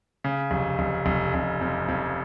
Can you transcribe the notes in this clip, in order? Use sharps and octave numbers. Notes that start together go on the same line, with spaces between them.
C#3
F1
F1
F1
F1
F2
F2